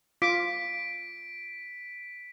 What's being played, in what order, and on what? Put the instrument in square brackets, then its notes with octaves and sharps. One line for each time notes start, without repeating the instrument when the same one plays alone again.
[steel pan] F4 D6 [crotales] B6 D7